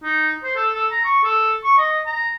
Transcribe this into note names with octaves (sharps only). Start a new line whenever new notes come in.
D#4
C5
A4
A4
A#5
C#6
A4
C#6
D#5
A#5